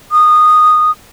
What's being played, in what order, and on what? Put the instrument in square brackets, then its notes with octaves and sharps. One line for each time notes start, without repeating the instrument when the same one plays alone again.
[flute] D#6